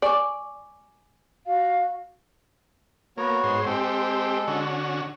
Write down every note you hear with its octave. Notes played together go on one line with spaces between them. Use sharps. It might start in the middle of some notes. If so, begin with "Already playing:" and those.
D5 G#5 C#6 D6
F#4 F5
A#3 B3 F#4 C#5
G#2 C5
G#3 C4 G4 A4
D3 C#4 F#4